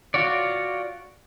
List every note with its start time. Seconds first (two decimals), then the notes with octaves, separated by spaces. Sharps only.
0.14 F4 F#4 C#5 D5